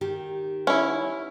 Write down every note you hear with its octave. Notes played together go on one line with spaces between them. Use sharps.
D#3 G4
C#4 E4